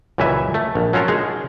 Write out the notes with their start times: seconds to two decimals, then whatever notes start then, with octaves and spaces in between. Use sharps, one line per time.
0.18 C#2 F#2 A#2 E3 E5 G#5
0.54 A3
0.75 A#1
0.93 F#3 C#4 F4 A4 A#4
1.08 G#3 D#4 G#4